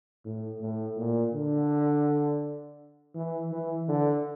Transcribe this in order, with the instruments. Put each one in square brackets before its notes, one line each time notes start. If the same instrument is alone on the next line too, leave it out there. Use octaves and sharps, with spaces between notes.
[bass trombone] A2
A2
A#2
D3
E3
E3
D3